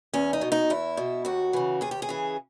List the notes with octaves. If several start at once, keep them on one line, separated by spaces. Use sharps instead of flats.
E2 C#4
D#4
B2
D#4
E2 E4
B2
D#2 F#4
C#3 E3
D#2 G#4
G4
G#4
C#3 E3